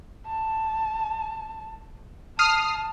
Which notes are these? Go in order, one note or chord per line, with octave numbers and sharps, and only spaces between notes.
A5
A5 D#6 F6 C7